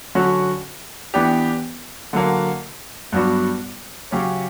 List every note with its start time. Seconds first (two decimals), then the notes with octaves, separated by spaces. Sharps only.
0.15 D3 F#3 C#4 F#4
1.14 E3 B3 D4 G4
2.13 D3 F#3 A#3
3.12 G2 F#3 B3 D4 F#4
4.11 C#3 F#3 C#4 G4 C#5